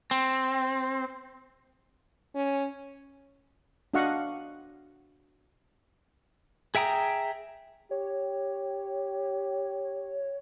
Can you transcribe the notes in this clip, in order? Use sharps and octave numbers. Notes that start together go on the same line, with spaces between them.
C4
C#4
D4 F#4 D#5 F5 F#5 C#6
G#4 E5 G5 A#5 D#6
G4 C#5